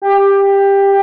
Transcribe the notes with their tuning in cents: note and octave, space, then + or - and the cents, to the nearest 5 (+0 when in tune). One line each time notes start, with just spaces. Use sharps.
G4 +15